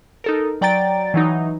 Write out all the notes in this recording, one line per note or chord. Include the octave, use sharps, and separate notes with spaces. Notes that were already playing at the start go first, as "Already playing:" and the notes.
D#4 A4 A#4
F#3 D5 G5 A#5 A6 D7
E3 F#3 D#4